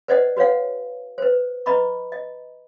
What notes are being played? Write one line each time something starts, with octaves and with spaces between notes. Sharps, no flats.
B4 C5 D5 D#5 F#5
F#4 B4 C#5 F5 F#5
B4 C5
B4 D#5 A#5 B5 C#6
D#5